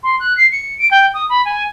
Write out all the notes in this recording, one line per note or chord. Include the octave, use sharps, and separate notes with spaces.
C6
F#6
C7
C#7
D7
G5
D#6
B5
G#5